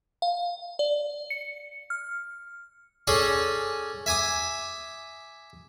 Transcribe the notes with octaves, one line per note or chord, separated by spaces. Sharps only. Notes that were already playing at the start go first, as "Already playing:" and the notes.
F5
D5
C#7
F6
C#4 G#4 A4 D5 A5
E5 G#5 D6 D#6